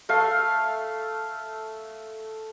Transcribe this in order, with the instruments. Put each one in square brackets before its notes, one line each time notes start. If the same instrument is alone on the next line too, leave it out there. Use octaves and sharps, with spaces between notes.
[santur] A3 F5